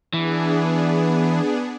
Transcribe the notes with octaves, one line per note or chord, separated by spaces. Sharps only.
E3 B3 D4 G#4